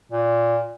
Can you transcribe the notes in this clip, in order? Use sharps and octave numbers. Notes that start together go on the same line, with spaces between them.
A#2